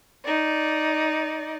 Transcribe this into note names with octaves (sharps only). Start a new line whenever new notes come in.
D#4 D5